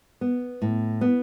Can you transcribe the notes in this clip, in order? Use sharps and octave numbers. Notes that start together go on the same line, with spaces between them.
B3
A2
B3